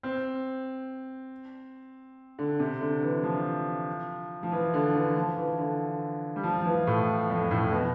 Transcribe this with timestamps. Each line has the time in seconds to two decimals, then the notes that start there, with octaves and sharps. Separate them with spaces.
0.03 C4
2.39 D3
2.60 C3
2.81 D3
3.03 E3
3.23 F3
4.43 F3
4.52 E3
4.74 D3
4.95 E3
5.16 F3
5.37 E3
5.59 D3
6.36 G3
6.43 F3
6.61 F3
6.65 E3
6.87 A2
7.30 F2
7.51 A2
7.72 B2